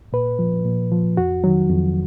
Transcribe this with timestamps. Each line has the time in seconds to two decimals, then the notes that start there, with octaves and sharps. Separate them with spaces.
0.13 A#2 B4
0.39 F3
0.65 A#2
0.92 F3
1.17 F2 F#4
1.44 D#3 F#3
1.69 F2